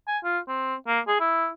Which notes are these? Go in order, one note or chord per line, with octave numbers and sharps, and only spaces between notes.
G#5
F4
C4
A#3
G#4
E4